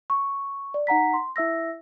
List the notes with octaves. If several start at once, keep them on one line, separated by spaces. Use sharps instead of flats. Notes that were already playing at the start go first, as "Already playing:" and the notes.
C#6
D5
D#4 F#5 A#5 B6
C6
E4 E5 E6 A#6